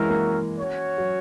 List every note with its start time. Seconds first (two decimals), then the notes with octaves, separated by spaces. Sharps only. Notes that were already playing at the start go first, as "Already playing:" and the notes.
Already playing: E3 G#3 C#4 F#4 A#4 E5
0.10 A#3
0.58 C#4 F#4 C#5
0.98 F#3